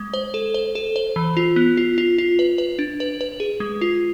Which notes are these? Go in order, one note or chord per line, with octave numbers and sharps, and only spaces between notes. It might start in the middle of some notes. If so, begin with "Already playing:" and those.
Already playing: G#3
C5
A4
C5
A4
C5
E3
F4
B3
F4
F4
F4
B4
B4
D4
B4
B4
G#4
G#3
F4